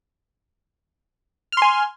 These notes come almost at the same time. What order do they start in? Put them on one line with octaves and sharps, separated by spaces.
F6 C6 G#5